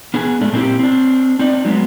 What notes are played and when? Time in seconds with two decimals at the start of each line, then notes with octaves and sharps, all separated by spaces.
0.14 B3 D4 G#4 G#5
0.41 A2 G#3 A3 D4
0.53 A#2 C4 D#4 E4 G4
0.79 C4 D4
1.39 C4 D#4 D5
1.65 F#3 G#3 B3